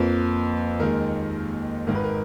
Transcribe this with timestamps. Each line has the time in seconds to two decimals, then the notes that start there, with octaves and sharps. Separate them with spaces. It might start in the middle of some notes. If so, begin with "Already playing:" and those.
Already playing: F2 F3 A#3 B4
0.79 D#2 D#3 G#3 A#4
1.87 G#1 G#2 D#3 A#4
1.95 B4
2.04 A#4